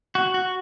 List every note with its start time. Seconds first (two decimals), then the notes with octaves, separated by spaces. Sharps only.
0.15 F#4
0.34 F#4